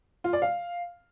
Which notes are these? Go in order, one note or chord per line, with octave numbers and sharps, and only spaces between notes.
F4
D5
F5